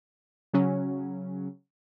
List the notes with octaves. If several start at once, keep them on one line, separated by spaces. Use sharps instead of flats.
C#3 F#3 C#4